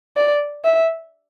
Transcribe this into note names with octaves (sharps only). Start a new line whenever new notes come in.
D5
E5